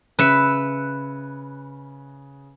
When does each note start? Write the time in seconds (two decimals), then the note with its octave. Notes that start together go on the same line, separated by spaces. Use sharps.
0.19 C#3 B4 E5 F#6 C#7